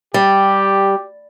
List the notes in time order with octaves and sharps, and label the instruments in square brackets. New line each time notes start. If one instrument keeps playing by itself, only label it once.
[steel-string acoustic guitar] G3 [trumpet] G4